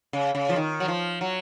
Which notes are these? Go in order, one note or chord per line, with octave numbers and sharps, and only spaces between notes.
C#3
C#3
F3
D#3
F#3
F3
F#3